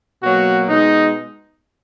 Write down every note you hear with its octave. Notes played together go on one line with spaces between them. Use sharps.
B2 F#3 A#3 F#4
B2 G#3 D#4